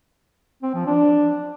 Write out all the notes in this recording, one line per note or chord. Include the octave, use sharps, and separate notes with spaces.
C4
F3
D4